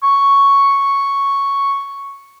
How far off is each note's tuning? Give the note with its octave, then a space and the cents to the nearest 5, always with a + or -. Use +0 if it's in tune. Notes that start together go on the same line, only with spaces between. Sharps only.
C#6 +0